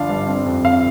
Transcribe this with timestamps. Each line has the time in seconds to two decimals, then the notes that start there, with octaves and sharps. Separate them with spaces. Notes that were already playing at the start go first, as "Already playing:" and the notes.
Already playing: G1 F3 D4 F5
0.09 G2
0.27 C4
0.46 F2
0.64 F2 F5